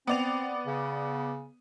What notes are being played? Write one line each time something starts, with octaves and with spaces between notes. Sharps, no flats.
B3 C4 D5 F7
C#3